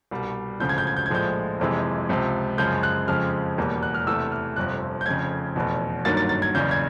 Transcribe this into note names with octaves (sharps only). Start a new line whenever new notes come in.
C2 B2 G3
E1 D2 C#3 F3 G6
G#6
G6
G#6
G6
G#6
A#1 A2 F3 G#3 G6
F#1 F2 C3 E3 G#3
C#2 C3 F3
F#2 C#3 F3 G#3 G6
F#6
F2 C#3 F3 G#3 F6
E1 E2 B2 G3 A#3
F#6
F6
E2 C3 E3 A3 E6
F6
G1 F2 C3 F3 F#6
G6
F1 F2 C#3 G#6
F1 E2 B2
G1 G2 D#3 F#3 A#3 A6
A6
A6
G#6
F#1 E2 C#3 G6
G#6